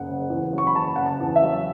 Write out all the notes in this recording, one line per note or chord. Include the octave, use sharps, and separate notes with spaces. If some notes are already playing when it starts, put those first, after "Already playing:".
Already playing: F#1 F#5
C#3
E2
F#3
C#6
B5
F#1 A5
C#3 F#5
A5
E2
E5
F#3